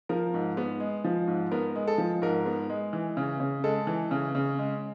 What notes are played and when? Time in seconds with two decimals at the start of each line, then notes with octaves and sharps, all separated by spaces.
0.09 F3 A#4
0.34 G#2
0.57 B3
0.80 G#3
1.04 F3
1.27 G#2
1.51 B3 A#4
1.75 G#3
1.87 A4
1.98 F3
2.22 G#2 A#4
2.46 B3
2.69 G#3
2.93 E3
3.17 C#3
3.40 C#3
3.64 G#3 A4
3.87 E3
4.11 C#3
4.35 C#3
4.59 G#3